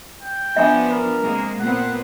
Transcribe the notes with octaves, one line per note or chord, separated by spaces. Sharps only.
G5
F3 B3 D4 E5 G#5
A#4
C3 G#3 A#3
A#2 B3 C4 F#5